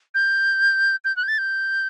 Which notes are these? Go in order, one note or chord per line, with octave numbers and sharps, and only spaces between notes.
G6
G6
F#6
G6
A6
G6